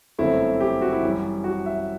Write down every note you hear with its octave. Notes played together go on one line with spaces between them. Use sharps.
G1 F#2 F#3 A3 C4 E4
G4
F#4
E4
F#2 E3 G3
F#4
E5